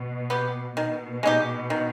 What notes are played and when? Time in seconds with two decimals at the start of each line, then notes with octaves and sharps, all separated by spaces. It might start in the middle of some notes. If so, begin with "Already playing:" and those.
Already playing: B2
0.30 B3 G4
0.76 B2 D#3
1.23 G#3 D#4 G4
1.70 D#3